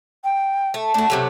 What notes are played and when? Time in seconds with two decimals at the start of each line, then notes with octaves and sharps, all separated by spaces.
0.24 G5
0.74 A3
0.94 A3 D4 F#4
1.10 C3 F#3 A3 G4